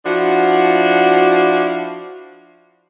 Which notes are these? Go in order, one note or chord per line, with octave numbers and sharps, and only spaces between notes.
F3 D4 E4 F#4